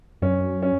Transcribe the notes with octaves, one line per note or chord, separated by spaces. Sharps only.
F#2 C#4
C#4